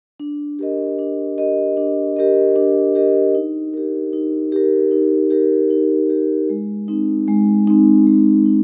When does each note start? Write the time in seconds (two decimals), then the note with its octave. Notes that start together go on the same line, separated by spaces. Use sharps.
0.20 D4
0.59 G4 A#4 D#5
0.99 D4
1.38 G4 A#4 D#5
1.77 D4
2.16 G4 A#4 D#5
2.56 D4
2.95 G4 A#4 D#5
3.35 D#4
3.73 G4 A#4
4.13 D#4
4.52 G4 A#4
4.91 D#4
5.31 G4 A#4
5.70 D#4
6.10 G4 A#4
6.50 G#3
6.88 C4 D#4
7.28 G#3
7.67 C4 D#4
8.06 G#3
8.46 D#4